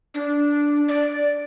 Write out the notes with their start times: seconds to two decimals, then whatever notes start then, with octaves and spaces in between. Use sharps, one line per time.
0.14 D4
0.88 D5